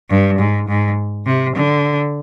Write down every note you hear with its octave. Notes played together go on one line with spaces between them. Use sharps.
G2
G#2
G#2
C3
D3